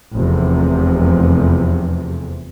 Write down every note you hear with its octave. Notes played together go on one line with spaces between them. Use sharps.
F1 E2 C3